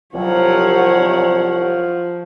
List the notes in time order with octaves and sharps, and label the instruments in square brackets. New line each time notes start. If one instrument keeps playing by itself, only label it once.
[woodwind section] C2 F#3 [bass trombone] F3 [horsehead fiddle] C#5 F#5